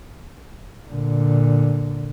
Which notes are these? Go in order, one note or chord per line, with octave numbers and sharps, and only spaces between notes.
A#2 D3